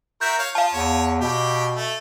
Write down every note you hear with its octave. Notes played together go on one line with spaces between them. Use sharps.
F#4 A#4 E5 G6
C#5 F5
F4 F5 A5
E2 C#5
B2 G4
A3